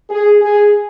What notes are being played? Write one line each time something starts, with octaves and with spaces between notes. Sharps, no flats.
G#4
G#4